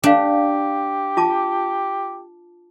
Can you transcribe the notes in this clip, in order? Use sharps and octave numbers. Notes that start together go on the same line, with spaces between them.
D4 G4 C#5 F5
F4 A5 D6